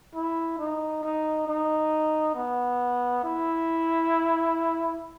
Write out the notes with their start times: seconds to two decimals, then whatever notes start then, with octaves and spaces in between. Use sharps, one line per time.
0.15 E4
0.59 D#4
1.03 D#4
1.48 D#4
2.35 B3
3.24 E4